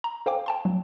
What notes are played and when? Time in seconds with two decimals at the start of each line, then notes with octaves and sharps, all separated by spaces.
0.04 A#5
0.26 A4 C5 F5 G5 G#5 D6
0.46 G5 A5 C6
0.65 F#3